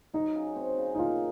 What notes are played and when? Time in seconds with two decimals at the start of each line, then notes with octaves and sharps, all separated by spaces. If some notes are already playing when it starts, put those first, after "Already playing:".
0.14 F#3 D#4
0.35 C#3
0.56 C4
0.78 C#3
0.95 D#4
0.99 A#3 F4